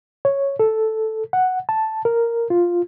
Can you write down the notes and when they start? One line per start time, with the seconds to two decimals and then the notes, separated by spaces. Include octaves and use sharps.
0.25 C#5
0.60 A4
1.33 F#5
1.69 A5
2.05 A#4
2.50 F4